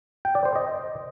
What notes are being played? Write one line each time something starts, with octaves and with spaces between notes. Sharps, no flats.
G5
D5
C5
D#5